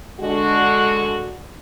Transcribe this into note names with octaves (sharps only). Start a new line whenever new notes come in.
D3 G#3 F#4